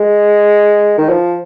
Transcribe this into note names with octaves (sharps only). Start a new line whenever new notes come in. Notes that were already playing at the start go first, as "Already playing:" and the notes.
Already playing: G#3
D#3
F3